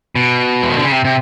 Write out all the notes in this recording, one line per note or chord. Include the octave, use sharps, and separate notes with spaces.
B2
E3
D#3
D3
C#3
C3
C3